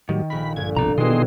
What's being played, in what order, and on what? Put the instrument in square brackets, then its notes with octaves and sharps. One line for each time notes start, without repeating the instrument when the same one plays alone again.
[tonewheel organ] A2 F#3 G3 [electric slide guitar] D#3
[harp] A#1 A#4 [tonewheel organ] B5
[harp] G1 [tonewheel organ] G#6
[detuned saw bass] C2 [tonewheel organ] B2 F3 [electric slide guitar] D4 A#5
[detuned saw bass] B2 [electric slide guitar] D#3 E3 [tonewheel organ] G#4 D#5 C6